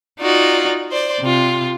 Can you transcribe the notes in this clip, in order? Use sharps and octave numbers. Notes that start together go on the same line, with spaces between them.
D#4 F4 F#4 D5
C5 D5
C3 F4